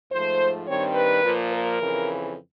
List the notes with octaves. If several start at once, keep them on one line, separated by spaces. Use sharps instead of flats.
G#2 F3 A3 C5
G2 D#3 G3 C4 C#5
B4
A#2 F3 A#3
A#4
F2 C#3 E3